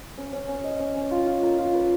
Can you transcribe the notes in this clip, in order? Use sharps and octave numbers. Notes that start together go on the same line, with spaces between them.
C#4
C#4
C#4
D#5
C#4
C#4
F4
F4
A#3
F4
B4